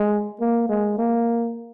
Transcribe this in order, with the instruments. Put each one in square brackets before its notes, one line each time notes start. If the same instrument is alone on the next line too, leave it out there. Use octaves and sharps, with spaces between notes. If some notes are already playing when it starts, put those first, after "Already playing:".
Already playing: [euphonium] G#3
A#3
G#3
A#3